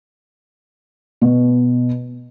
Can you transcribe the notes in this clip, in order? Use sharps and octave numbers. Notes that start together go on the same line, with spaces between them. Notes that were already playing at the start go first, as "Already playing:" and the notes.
B2